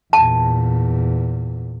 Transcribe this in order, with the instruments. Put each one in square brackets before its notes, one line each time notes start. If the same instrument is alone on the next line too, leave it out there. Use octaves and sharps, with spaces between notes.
[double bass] E2 A#2 [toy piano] A5